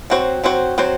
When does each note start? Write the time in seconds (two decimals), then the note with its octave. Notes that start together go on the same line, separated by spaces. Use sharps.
0.10 F#3 C4 F#4 C5
0.44 F#3 C4 F#4 C5
0.78 F#3 C4 F#4 C5